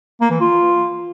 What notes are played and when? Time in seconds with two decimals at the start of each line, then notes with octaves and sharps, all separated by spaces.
0.21 A#3
0.31 E3
0.41 F4